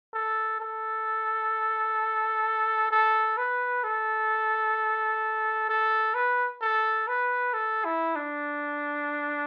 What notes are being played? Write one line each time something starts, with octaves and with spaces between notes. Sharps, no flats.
A4
A4
A4
B4
A4
A4
B4
A4
B4
A4
E4
D4